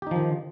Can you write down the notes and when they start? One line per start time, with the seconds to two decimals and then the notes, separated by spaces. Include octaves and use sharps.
0.02 G4
0.07 D#4
0.11 F3
0.16 D#3